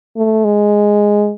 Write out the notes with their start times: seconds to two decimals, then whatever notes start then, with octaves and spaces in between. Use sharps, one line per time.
0.16 A3
0.45 G#3